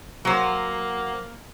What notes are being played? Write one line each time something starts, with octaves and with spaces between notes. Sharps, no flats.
F#3 A#3 C5